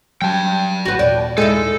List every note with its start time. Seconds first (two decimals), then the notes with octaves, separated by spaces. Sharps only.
0.22 F#3 G3 G5 A5
0.85 A1 F#4 B4
0.99 D#2 A#2 D5
1.38 G#3 D#4 E4 A4